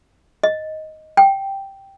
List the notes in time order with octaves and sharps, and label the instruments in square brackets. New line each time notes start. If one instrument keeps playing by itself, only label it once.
[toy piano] D#5
G5